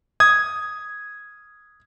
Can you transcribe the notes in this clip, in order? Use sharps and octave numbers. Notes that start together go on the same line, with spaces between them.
D#6 G#6